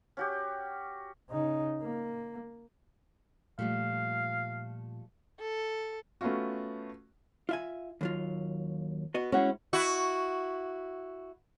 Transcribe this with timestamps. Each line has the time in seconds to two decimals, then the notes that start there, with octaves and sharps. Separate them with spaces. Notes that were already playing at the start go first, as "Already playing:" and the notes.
0.17 C#4 F#4 G4
1.30 C#3 D#4
1.82 A#3
3.59 A#2 F3 G3 A3 F5
5.40 A4
6.21 A3 B3 C#4 F4 F#4
7.49 F4 E5 G#5
8.01 D#2 F#3 F4
9.14 B3 F#4 D#5
9.32 G#3 C#4 E4 F#4 F#5
9.73 E4 F#4